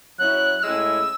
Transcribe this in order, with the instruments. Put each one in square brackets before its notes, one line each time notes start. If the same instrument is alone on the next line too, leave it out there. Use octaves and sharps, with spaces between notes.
[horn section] F#3 C#4 E4 [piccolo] F#6
[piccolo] F#6
[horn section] A2 G#3 C#4 E4 [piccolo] E6